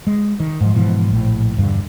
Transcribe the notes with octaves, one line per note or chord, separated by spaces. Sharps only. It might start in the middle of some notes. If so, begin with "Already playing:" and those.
G#3
D#3
G#2 F3
G#2 B2 E3 F3
A#1 A2
E1 G2 D3